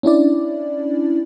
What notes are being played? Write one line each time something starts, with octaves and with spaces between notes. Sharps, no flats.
C#4 D4 E4 D5